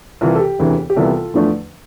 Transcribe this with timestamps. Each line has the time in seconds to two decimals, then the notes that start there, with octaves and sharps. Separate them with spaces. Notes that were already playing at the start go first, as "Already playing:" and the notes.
0.21 C2 C3 E3 F4
0.35 A4
0.40 G4
0.59 E1 D2 C3 E3
0.90 G4
0.96 C2 C3 E3 G3 B3 F4 A4
1.34 E2 D3 F3 A3 D4